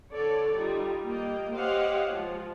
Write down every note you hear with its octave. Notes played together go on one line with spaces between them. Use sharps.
D3 A4 C#5 D5
G3 D#4 F4
G3 A#3 D#5 G5
G4 C5 C#5 D#5 F5 F#5
F3 G#3 F4